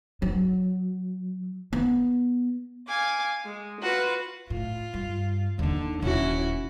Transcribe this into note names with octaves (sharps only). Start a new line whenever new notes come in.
F#3
B3
F5 G#5 D6
G#3
F4 F#4 B4
A2 F4
G2
D#2 D3 D#4
D#1 D#2 C#4 E4 F#4